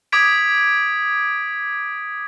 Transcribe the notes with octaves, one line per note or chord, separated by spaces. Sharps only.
D6 D#6 G#6 B6 D7